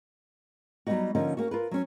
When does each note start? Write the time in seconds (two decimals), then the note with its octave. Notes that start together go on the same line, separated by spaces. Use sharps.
0.87 F#3 G3 A#3 B3 D#4 F#4
1.15 D3 F3 A#3 C#4 D#4
1.37 A#3 C#4 F#4
1.51 F4 A#4 B4
1.71 F#3 C#4